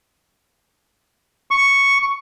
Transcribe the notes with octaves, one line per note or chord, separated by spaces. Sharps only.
C#6